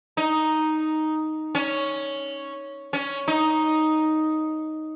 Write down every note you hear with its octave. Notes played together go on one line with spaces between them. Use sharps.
D#4
C#4
C#4
D#4